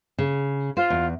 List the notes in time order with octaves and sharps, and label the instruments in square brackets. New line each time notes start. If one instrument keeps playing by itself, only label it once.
[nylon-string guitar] C#3
[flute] F4 [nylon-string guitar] C5
[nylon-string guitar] E2